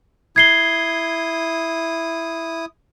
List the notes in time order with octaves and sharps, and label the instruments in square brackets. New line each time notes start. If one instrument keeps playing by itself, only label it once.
[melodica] E4 D#6 [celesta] G#6 C7 G7